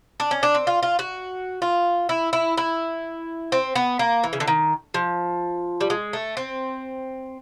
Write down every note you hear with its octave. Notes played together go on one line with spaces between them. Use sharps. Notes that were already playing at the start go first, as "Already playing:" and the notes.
D4
C#4
D4
C4
F4
F4
F#4
F4
E4
E4
E4
C4
B3
A#3
E3
C#3
D3
D#3
F3
G3
G#3
A3
C4